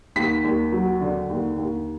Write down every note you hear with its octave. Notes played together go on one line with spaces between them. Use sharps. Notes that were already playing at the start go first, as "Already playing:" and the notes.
D#2 B6
D#2
F#3
D3
D#2
D#2